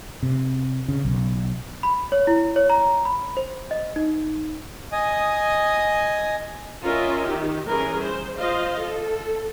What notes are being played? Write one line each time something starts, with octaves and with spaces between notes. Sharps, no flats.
C3
C#3
B1
B5
C#5
E4
C#5
A#5
B5
C5
D#5
D#4
D#5 G#5 D#6
C#4 F4 A#4 D#5 E5
D#3 G4
E3 G3 C#4 G#4 A#4
C5
F4 C5 D#5 F5
A4